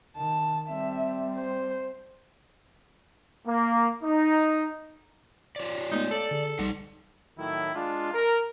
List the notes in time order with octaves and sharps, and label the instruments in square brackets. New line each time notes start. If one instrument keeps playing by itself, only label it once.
[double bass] D#3 [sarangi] A5
[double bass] G3 C4 [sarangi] E5
[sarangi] C5
[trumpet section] A#3
D#4
[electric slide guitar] F4 C#5 D5
[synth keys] G#3 A3 B3 [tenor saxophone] D#4
[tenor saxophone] A4 [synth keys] C#5 F5 [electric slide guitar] D5
[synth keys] D3 G#4
[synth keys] A#1 G3 [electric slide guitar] D#4 F#5
[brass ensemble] A2 D#3 F#3 E4
G#3 D4 F4
A#4